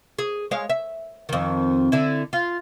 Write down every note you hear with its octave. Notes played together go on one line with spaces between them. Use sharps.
G#4
G#3 C#5 F5
E5
F2 D#3
D3 E4
F4